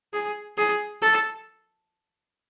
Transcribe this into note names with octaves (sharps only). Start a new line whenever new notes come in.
G#4
G#4
A4